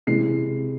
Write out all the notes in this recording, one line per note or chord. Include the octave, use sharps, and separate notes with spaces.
C3 E3 G#3 C7